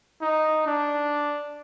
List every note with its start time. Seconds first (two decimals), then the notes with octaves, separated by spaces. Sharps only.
0.21 D#4
0.67 D4